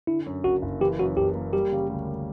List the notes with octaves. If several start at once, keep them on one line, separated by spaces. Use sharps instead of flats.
D3 E4
F#2
F#1 F#4
F#1
E3 G4
F#2 F#4
F#1 G4
A#3
G3 G4
C#3
D2
A#3